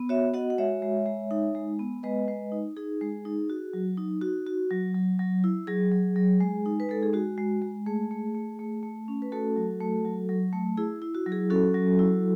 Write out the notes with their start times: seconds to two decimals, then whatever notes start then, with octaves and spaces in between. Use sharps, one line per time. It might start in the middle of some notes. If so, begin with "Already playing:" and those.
Already playing: B3
0.09 F#4 C#5 E5
0.34 F#4 D#5 F#5
0.50 F#5
0.58 G#3 C#5 E5
0.82 G#3
1.06 G#3
1.31 D#4
1.55 G#3
1.79 B3
2.03 G#3 B4 D#5
2.28 G#3
2.52 D#4
2.77 D#4 G#4
3.01 G#3
3.25 D#4
3.50 F#4
3.73 F#3
3.97 D#4
4.22 D#4 F#4
4.47 F#4
4.71 F#3
4.95 F#3
5.19 F#3
5.44 E4
5.67 F#3 G#4
5.92 F#3
6.16 F#3
6.40 G#3
6.66 D#4
6.80 B4
6.89 G#3 A4
7.03 G#4
7.13 G#3 F#4
7.38 G#3
7.62 G#3
7.86 A3 G#4
8.11 A3
8.35 A3
8.59 A3
8.83 A3
9.08 C#4
9.22 B4
9.32 A3 F#4 A4
9.56 F#3
9.80 A3
10.05 F#3
10.29 F#3
10.53 A3
10.77 E4 G#4
11.02 E4
11.15 F#4
11.26 F#3
11.32 G#4
11.50 C#4 F#4 A4
11.74 F#3
11.99 E4